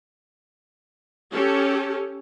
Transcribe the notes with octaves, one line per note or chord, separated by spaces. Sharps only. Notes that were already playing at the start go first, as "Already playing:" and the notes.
C#4 G4 A4